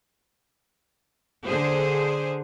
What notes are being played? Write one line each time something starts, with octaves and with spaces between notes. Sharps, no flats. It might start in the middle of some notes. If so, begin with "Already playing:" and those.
D3 G#4 C5